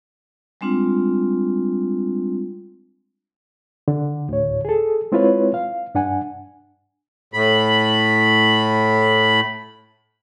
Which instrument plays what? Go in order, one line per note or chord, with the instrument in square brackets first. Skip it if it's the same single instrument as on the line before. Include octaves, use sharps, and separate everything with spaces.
[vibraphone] G3 G#3 C4 D4 F4
[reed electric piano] D3
D2 A2 C#5
G#4 A4
G#3 C4 E4 F4 B4 C#5
F5
G2 D4 F#5 G#5
[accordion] A2 B5